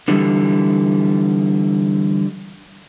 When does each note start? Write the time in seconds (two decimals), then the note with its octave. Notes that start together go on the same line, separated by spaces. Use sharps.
0.08 D3 E3 G3